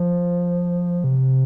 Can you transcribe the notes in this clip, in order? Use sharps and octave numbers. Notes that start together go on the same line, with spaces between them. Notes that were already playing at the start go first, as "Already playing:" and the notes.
Already playing: F3
C3